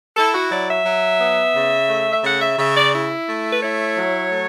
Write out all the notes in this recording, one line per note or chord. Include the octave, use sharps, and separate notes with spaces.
E4 A4
F#4
F#3 D5
E5
F#3
B3
C#3
A3
E5
C#3 F#5
E5
C#3 E5
D5
E4
A3
B4
E4 C#5
F#3
A3